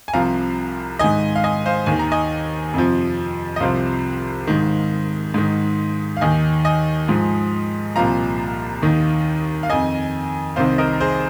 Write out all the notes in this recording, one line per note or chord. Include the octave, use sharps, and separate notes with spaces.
G#5
C2 C3 F3 F5 A#5
G#2 D#3 D#5 G#5
F5
D#5 G#5
C5 F5
D#2 D#3 G#5
A#5
D#5 G#5
F2 C3 F3
D#5
C2 C3 F3 C5 F5
G#2 D#3
G#2 D#3
F5
D#2 D#3 D#5 G#5
D#5 G#5
G#2 F3
C2 A#2 F3 F5 A#5
D#2 D#3
F5
F2 D#3 D#5 G#5
C2 C3 D#3 C5 F5
A#4 D#5
G#4 C5